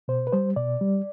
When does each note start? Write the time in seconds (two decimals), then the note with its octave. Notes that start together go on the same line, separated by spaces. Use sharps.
0.08 B2 C5
0.27 B4
0.32 G3 C5
0.56 B2 D5
0.81 G3